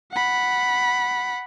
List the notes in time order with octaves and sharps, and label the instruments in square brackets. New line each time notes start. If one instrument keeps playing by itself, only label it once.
[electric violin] F#5 B5